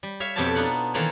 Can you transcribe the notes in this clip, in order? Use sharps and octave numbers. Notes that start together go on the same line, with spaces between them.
G3
C#5 E5 F5
F2 B2 G4 A4 C#5 A5
B3 D4 D#4 F4 F#5
D#3 E3 A#3 F4 A4 C#5